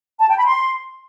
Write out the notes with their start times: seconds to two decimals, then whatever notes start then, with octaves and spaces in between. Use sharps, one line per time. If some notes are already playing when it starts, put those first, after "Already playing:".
0.20 A5
0.29 G5
0.37 B5
0.46 C6